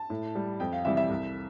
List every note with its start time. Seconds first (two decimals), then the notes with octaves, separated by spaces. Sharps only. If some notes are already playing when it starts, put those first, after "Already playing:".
Already playing: A5
0.10 A2
0.35 G3
0.60 F2 G5
0.73 F5
0.85 C3 E3 G3 E5
0.97 E5
1.10 C2